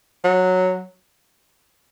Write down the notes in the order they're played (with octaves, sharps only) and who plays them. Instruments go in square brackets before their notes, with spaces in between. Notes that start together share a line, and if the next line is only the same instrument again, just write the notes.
[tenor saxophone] F#3